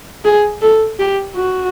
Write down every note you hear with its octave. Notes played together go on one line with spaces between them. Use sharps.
G#4
A4
G4
F#4